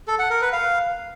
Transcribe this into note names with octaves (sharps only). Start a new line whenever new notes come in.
A4
F#5
A#4
B4
F5